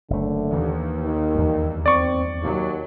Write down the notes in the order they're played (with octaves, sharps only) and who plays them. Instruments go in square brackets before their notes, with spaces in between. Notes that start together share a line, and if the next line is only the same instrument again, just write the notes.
[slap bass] F#1 A3 [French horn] D3
[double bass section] D#2 [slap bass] E3
[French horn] D#3
[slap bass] E2 G2
[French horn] C4 [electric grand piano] D5 C#6
[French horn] D#2 [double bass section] F#3